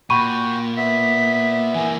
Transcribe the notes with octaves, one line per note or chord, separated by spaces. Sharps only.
A#2 F#4 G5 B5 C#6 D#7
B3 E5 B6
E3 A#3 G#5